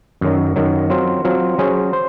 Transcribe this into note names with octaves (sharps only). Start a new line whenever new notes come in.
F#2 D#3 F#3
F#2 D#3 F#3
F#3 C4 F4
F#3 C4 F4
F#3 C#4 G#4 C5
C5